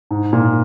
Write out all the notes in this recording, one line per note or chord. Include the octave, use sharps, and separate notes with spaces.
G#2
A#2